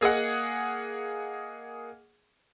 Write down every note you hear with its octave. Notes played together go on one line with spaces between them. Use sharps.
A#3 G#4 D#5 F#5